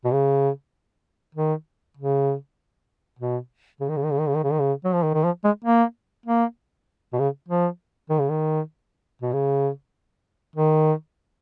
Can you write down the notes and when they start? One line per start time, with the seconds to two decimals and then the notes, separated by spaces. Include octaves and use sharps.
0.05 B2
0.13 C#3
1.35 D#3
1.97 C#3
3.19 B2
3.80 C#3
3.89 D#3
3.97 C#3
4.04 D#3
4.12 C#3
4.20 D#3
4.28 C#3
4.36 D#3
4.44 C#3
4.52 D#3
4.59 C#3
4.84 F#3
4.94 F3
5.03 D#3
5.14 D#3
5.24 F3
5.44 G#3
5.65 A#3
6.26 A#3
7.13 B2
7.19 C#3
7.48 F3
8.10 D#3
8.19 C#3
8.29 D#3
9.22 B2
9.33 C#3
10.56 D#3